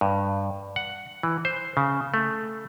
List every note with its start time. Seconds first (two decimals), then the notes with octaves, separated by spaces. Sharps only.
0.01 G2
0.76 F#5
1.23 E3
1.45 C5
1.77 C#3
2.14 A3